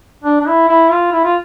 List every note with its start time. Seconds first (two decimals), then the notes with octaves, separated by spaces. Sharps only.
0.24 D4
0.41 D4
0.47 E4
0.68 E4
0.90 F4
1.12 E4
1.24 F4